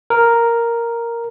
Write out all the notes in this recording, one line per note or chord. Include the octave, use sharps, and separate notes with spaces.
A#4